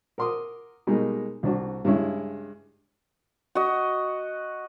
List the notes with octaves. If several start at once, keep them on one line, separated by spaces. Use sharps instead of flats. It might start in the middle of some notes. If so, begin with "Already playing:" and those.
A#4 F#5 C6 D6 D#6
B2 G3 G#3 A#3 D#4
C2 D4 F#4
G2 C#3 G#3 C#4 E4
F#4 D#5